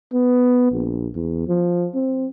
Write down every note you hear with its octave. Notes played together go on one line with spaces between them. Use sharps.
B3
A#1
E2
F3
C4